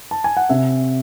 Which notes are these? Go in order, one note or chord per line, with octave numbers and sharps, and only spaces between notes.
A5
G#5
F#5
C3 E5